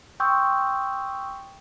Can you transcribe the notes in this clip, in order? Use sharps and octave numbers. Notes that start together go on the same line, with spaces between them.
G5 C6 C#6 D#6 E6 G6